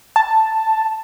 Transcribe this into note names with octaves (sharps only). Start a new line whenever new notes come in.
A5